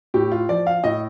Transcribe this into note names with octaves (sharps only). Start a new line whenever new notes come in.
A2 G4
F4
F3 D5
F5
A2 D#5